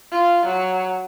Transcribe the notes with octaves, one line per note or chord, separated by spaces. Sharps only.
F4
F#3